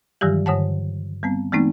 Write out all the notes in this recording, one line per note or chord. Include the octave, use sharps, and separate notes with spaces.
G2 D#3 E3 F#3 G3 G4
G2 D3 C#5 F#5 A5
G3 B3 C4
E3 G#3 A3 B3 C4 D#4